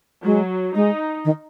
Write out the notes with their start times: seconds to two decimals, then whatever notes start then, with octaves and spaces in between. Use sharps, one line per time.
0.25 F#3 G#3
0.75 G#3 D#4
1.25 D#3